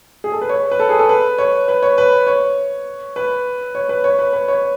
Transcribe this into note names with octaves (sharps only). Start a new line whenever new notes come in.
G#4
A4
B4
C#5
B4
A4
G#4
A4
B4
C#5
B4
C#5
B4
C#5
B4
C#5
B4
C#5
B4
B4
C#5